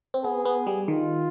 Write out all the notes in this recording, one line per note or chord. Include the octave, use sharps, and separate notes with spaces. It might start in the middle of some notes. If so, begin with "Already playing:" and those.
C4
B3 G#4
B3
G3
D#3 F4